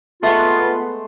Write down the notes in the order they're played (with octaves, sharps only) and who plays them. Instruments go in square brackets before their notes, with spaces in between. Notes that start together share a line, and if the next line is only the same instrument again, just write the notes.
[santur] G#3 A3 C6 [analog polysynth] B3 [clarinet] F4